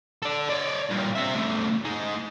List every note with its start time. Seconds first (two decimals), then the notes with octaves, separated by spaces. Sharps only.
0.22 A4 D5
0.50 C#5 D5
0.90 G2 A#2
1.16 C4 E5
1.35 C#3 A3
1.85 G#3 D#4